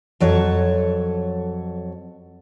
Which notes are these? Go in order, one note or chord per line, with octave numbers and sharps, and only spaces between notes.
F2 F#3 A4 C#5